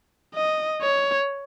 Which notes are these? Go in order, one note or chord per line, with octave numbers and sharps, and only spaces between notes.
D#5
C#5